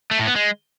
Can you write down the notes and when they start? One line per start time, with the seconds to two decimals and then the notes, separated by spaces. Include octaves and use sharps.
0.11 A3
0.19 A2
0.27 B3
0.35 G#3